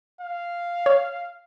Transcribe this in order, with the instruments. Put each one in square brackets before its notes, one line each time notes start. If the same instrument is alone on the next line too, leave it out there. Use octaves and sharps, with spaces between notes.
[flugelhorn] F5
[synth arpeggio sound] C#5